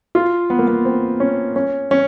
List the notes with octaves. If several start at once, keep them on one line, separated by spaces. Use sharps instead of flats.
F4
B3
A#3
B3
C4
C#4
C#4
C#4